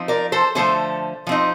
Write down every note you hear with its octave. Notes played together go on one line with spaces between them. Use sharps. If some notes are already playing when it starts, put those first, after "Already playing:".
Already playing: F3 C4 D#4
A#4 D5
A4 C5
D3 F3 A3 A4 C5
F3 C4 D#4